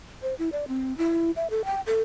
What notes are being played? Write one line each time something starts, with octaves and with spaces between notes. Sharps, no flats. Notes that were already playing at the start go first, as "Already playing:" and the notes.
C5
E4
D5
C4
E4
E5
A4
G5
A4